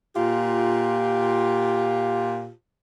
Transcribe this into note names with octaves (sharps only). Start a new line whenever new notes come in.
A#2 F4 G4